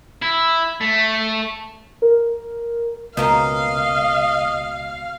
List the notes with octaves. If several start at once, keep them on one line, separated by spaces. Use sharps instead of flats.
E4
A3
A#4
C#2 B2 A#3 C#4 D#5 F5